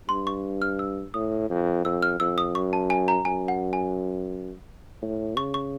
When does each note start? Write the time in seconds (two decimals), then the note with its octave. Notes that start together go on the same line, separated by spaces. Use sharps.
0.09 G2 C6
0.27 C#6
0.62 F6
0.79 E6
1.14 A2 D#6
1.50 F2
1.85 F2 E6
2.03 F6
2.20 F2 E6
2.38 D#6
2.55 F#2 C#6
2.73 A5
2.90 G#5
3.08 A#5
3.25 F#2 G#5
3.48 F#5
3.73 G#5
5.02 A2
5.37 C#3 C#6
5.54 C#6